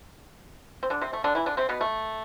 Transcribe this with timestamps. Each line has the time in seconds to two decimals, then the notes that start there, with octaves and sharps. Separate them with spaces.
0.83 C4
0.90 D3 D4
1.01 C3 C4
1.13 A3
1.24 D3 D4
1.35 E3 E4
1.46 D3 D4
1.57 C3 C4
1.69 B2 B3
1.81 A3